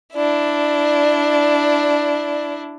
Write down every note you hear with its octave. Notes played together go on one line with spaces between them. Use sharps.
D4 E4 D5